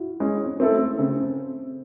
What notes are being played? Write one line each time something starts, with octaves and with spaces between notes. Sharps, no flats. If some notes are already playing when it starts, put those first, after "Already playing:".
Already playing: E4 F#4
G#3 C#4
C4
C4 E4 A4
A3
C#3 C4